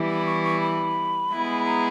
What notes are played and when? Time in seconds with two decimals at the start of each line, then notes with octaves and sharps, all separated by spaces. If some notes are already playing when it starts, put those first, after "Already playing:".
Already playing: E3 G3 B3 E4
0.09 B5
0.26 C#6
0.44 C#6
0.61 B5
1.32 G#3 B3 E4 G#4
1.66 A#5